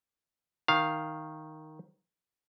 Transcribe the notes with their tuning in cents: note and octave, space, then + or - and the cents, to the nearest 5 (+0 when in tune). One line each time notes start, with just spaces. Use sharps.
D#3 +0 F5 +0